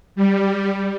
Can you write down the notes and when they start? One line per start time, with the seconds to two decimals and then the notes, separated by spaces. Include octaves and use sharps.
0.16 G3